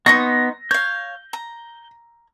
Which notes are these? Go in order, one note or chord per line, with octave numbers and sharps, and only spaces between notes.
B3 D#4 C6 C#6 A#6
C#5 F5 G6
A#5